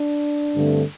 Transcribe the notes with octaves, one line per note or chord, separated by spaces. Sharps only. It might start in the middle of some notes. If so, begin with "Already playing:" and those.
Already playing: D4
G2 D3 A3 C4